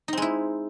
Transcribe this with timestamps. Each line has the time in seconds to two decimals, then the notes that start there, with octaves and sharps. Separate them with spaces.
0.08 D#4
0.13 C4
0.17 G#3
0.22 E4